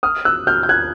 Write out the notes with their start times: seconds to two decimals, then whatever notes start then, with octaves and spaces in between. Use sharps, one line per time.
0.03 D#6 F6
0.25 E6 F#6
0.47 F6 G6
0.63 G6
0.69 F#6 G#6